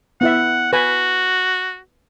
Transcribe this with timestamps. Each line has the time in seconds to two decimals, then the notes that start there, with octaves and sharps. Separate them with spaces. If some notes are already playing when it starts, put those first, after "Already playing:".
0.21 B3 E4 E5 F#5
0.73 F#4 B4 G#5